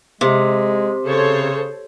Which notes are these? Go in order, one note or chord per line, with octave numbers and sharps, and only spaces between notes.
C3 G#3
C#3 A4 C5 C#5